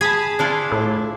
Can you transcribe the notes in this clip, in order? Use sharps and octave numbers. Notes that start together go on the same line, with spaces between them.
G#4 A5 B5 G#6
D4 E4 F4
A2